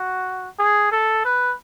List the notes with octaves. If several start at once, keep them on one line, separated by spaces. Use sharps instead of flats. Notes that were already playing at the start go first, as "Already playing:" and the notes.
Already playing: F#4
G#4
A4
B4